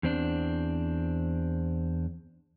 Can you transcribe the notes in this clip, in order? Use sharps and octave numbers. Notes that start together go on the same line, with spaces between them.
E2 C4 D4